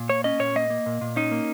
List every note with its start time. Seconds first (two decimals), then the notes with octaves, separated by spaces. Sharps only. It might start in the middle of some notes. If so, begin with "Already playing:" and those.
Already playing: A#2
0.10 A#3 C#5
0.24 C#4 D#5
0.39 A#2 C#5
0.56 A#3 D#5
0.70 A#3
0.86 A#2
1.01 A#2
1.16 C#4 D#4
1.31 A#3